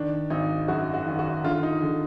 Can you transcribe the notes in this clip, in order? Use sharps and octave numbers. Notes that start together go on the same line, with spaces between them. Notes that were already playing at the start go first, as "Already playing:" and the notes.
Already playing: D#3 D4
G#1 D#4
F#2 F#4
F#4
D#3
F#4
D3 F4
D#4
D3